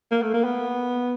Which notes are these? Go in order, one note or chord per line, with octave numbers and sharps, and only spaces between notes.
A#3
A3
A#3
B3